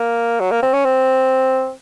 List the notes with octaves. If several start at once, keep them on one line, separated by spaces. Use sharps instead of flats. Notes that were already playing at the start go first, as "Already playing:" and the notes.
Already playing: A#3
F#3
A#3
C4
C#4
C4